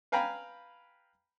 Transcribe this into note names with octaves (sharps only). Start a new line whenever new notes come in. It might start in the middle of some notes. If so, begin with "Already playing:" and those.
B4 F5 G5 G#5 A#5 B5